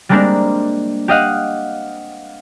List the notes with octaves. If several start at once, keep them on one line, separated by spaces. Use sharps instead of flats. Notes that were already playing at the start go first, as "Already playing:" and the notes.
G3 G#3 A#3 C4 D4 A#4
G4 D#5 F5 F#5